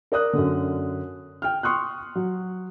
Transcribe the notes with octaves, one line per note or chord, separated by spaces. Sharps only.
A#4 D5 D#6 F#6
F#2 D3
G5 F6
C6 C#6 D#6 F#6
F#3